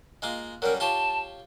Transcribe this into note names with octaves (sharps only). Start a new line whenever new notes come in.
G#3 A#3 F4
F#3 G3 C#4 A#4
F4 G4 C#5 A5